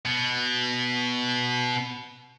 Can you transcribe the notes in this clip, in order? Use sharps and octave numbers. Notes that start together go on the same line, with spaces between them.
B2 B3